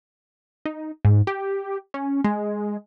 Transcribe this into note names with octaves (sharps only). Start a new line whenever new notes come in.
D#4
G#2
G4
C#4
G#3